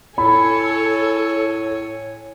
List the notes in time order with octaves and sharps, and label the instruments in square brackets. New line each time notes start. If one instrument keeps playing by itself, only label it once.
[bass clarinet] A2 [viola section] A4 [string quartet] C#5 G#5 [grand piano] B5